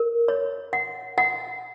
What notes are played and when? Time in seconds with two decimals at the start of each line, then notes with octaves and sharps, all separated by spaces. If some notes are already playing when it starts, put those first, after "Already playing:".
Already playing: A#4
0.28 C#5
0.73 F#5
1.18 F#5